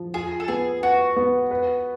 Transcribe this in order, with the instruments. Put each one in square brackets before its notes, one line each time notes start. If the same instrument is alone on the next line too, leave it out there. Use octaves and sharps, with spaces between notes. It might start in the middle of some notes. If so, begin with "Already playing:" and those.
Already playing: [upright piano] F3
[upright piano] F4 [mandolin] G#4
[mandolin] A4
[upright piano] B3 [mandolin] G#4
[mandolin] F#4 [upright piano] B4
[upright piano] B3
B4